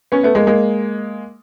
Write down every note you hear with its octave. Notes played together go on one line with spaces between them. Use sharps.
B3 C#4
A3 B3
G#3 A#3
G#3 A#3